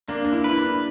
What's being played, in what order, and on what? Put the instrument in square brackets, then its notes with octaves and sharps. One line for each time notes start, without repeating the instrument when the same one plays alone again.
[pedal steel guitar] A#3 [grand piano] D4
[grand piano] D4
E4
[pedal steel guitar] B4
[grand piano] E4
D4